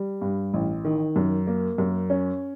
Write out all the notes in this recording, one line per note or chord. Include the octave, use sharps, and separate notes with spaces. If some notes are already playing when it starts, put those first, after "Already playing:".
Already playing: G3
G2
A1
D#3
F#2
A#3
F#2
C#4